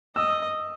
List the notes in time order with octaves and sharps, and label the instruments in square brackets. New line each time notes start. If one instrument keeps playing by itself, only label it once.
[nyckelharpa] D#5 [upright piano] E6